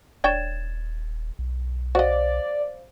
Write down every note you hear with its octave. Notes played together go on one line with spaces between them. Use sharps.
D#1 D4 C#5 G5 G#6 A6 E7
B1
F#4 C5 D5 D#5 F5